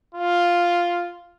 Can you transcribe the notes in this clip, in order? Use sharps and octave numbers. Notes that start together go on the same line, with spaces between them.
F4